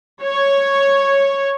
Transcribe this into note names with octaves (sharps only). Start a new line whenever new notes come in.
C#5